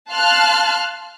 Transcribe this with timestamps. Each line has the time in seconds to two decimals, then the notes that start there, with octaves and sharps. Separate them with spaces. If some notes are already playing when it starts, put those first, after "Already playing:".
0.11 F5 A5 C6 F6 F#6